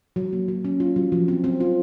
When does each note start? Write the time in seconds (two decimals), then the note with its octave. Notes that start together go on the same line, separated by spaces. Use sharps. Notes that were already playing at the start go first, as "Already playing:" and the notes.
0.16 F#3
0.33 A#3
0.48 F#3
0.65 C#4
0.80 F4
0.96 F#3
1.12 F3
1.28 C4
1.44 C4
1.60 F4